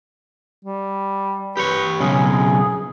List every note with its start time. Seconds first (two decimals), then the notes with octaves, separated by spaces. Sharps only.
0.65 G3
1.57 G4 B4 C#5
2.00 B1 C#3 G#4